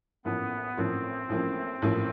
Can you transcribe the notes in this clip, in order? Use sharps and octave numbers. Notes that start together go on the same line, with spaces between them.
A1 A2 F3 A#3 B3 C#4
A1 A2 F3 A#3 C4 C#4
A1 A2 F3 A#3 C#4
A1 A2 F3 A#3 C#4